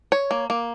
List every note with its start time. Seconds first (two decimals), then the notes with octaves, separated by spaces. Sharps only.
0.12 C#5
0.31 A#3
0.50 A#3